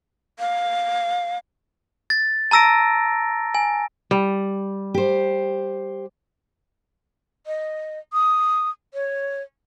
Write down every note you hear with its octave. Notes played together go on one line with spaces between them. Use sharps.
F5
A6
A5 A#5 E6 A#6 D7
G#5
G3
G4 C5
D#5
D#6
C#5